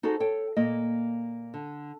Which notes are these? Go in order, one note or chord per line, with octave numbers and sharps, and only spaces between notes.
D#4 F#4 G#4 A4 C5
A4 C#5 G5
A#2 A#3 D#5
D3